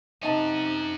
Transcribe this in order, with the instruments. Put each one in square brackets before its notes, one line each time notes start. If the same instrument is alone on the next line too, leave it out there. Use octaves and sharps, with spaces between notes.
[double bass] C3 [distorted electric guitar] C#4 F#4 [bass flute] D#4 [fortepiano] D#5 F#5 A5